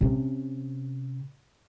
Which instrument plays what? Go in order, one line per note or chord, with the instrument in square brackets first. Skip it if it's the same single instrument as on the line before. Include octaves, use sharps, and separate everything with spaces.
[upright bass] C3 C#4